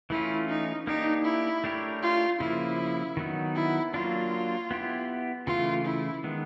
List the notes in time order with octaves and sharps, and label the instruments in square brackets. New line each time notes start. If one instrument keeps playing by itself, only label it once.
[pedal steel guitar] E3 A3 C#4 F4 [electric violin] E4
[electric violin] D#4
[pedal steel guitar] A#3 D4 G4 [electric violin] D#4
[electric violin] E4
[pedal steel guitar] A3 D4 G4 A#4 C#5
[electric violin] F4
[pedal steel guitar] C#3 F3 A#3 [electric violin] E4
[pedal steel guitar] D#3 F#3 B3 D#4
[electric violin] E4
[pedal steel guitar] F#3 A#3 D4 [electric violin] F4
[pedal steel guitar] B3 E4 G4
[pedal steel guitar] C#3 E3 A3 [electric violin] F4
[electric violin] E4
[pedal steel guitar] D#3 G#3 B3